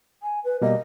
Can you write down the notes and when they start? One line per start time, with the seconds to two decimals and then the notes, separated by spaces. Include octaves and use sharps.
0.23 G#5
0.44 B4
0.62 B2 G3 A#3 D#5